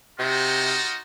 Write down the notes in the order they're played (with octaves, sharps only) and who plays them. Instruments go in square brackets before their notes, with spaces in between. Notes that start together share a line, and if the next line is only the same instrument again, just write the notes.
[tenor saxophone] C3 [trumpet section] D#4 F4 F#4